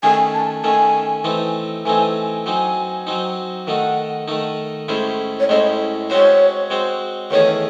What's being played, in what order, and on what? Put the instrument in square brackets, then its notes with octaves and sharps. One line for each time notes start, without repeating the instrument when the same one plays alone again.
[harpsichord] D#3 A3 C#4 [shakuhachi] G#5
[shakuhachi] A5
[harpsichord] D#3 A3 C#4 [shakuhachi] G#5
[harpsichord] E3 A3 C4 D#4
[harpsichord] E3 A3 C4 D#4 [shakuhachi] G#5
[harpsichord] F#3 C4 D#4 [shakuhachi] G#5
[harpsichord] F#3 C4 D#4
[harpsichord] D#3 A3 D#4 [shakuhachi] F#5
[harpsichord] D#3 A3 D#4
A2 G#3 C#4 E4 C5
[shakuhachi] C#5
[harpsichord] A2 G#3 C#4 E4 C5 [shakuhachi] D#5
[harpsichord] G#3 C4 F#4 C5 [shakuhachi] C#5
[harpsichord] G#3 C4 F#4 C5
[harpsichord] E2 D#3 A3 D#4 G#4 [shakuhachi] C#5